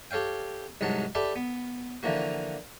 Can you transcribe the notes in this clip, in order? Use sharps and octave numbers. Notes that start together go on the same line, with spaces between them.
G4 A4 C#5 F5 G5
C2 G#2 F#3 F#5 A5
G4 A4 B4 D5 E5 A5
B3
D3 E3 F3 A#3 F#4